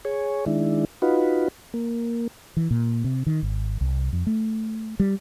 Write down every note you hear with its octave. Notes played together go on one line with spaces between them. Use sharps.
G#4 C#5
D#3 G#3 D4 E4
D#4 F4 F#4 B4
A#3
E3
A#2
C3
D#3
G#1
C2
F2
A3
G3